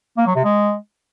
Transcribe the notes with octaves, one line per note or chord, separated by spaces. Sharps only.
A#3
F#3
C3
G#3